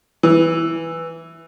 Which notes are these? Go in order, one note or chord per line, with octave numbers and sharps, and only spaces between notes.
E3